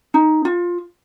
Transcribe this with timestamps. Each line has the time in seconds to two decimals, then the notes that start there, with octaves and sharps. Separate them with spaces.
0.14 D#4
0.45 F4